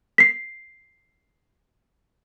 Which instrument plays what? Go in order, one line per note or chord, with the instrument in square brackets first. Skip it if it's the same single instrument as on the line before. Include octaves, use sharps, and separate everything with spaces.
[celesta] B6 C7